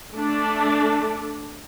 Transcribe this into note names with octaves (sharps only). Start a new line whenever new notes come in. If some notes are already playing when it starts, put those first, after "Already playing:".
A3 D4